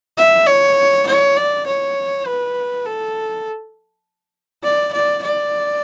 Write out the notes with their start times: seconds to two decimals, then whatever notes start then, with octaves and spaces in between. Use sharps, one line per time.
0.18 E5
0.47 C#5
1.07 C#5
1.36 D5
1.66 C#5
2.26 B4
2.85 A4
4.63 D5
4.93 D5
5.23 D5